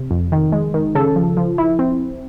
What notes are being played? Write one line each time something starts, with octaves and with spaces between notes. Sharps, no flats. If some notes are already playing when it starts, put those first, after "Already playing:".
Already playing: C3
F2
D#3
G#3
D#3
C#3 A4
F3
F3
E4
C4